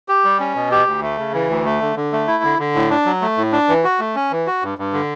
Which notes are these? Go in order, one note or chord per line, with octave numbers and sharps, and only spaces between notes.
G4
G3
C#4
B2
G4
D2
A3
C#3
E3
D2
A3
D3
D3
A3
E4
D3
D3
A2
D4
F#3
A3
A2
D4
E3
F#4
A3
C#4
E3
F#4
G2
G2
D3